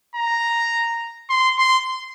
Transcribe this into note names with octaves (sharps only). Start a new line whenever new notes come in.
A#5
C6
C6